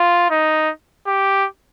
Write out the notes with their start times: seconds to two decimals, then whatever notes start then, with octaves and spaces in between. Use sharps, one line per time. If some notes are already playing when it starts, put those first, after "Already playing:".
Already playing: F4
0.30 D#4
1.07 G4